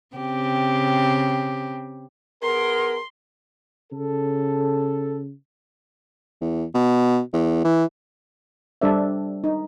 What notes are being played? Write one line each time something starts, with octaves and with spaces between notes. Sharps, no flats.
C#3 C4 G4
B3 G#4 A#4 C6
C#3 A4
E2
B2
E2
E3
G3 D4 A4 C5 D5 E5
D#4